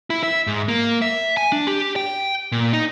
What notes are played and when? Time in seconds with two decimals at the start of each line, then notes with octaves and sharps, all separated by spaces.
0.10 E4
0.23 E5
0.47 G#2
0.68 A#3
1.02 E5
1.37 G#5
1.52 D4
1.67 G4
1.96 G5
2.52 A#2
2.73 D#4